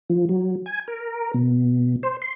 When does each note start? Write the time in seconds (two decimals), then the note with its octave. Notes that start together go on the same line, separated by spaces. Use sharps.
0.10 F3
0.29 F#3
0.66 G#5
0.88 A#4
1.34 B2
2.03 C5
2.22 C6